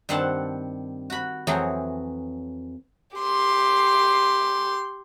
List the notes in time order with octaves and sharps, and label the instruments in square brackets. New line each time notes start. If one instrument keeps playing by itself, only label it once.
[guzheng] G2 D#3 C4 F#5 A5
F#4 B5
F2 E3 F#3 G#4
[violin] G4 C6